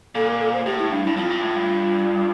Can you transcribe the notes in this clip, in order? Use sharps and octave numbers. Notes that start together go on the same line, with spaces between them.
A#2 A4
A#4
A4
C5
A2 G4
E4
G2 D4
G2 E4
F2 F4
G2
A2
G2